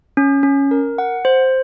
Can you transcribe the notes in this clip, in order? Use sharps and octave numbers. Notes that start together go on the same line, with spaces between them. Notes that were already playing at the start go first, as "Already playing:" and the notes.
C#4
C#4
A#4
F#5
C5